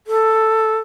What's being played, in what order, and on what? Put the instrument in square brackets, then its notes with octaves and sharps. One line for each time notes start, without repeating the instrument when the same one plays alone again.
[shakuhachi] A4